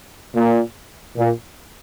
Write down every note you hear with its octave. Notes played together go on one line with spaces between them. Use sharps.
A#2
A#2